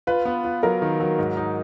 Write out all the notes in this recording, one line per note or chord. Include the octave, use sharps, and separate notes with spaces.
F4 B4
B3
F4
F#3 A#4
D#3
F#3
G#2
D#4